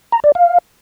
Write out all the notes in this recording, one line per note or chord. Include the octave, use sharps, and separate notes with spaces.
A#5
D5
F5